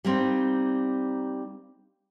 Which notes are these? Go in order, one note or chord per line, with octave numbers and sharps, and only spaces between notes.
G3 A#3 C4 D#4